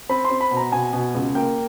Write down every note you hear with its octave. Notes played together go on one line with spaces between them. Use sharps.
C4 B5
C6
C4
B5
B2
A#5
B2 G#5
B2
C#2
A#3 G5